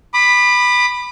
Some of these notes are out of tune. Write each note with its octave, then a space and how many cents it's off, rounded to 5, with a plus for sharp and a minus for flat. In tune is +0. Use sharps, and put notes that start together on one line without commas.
B5 +0 D6 +40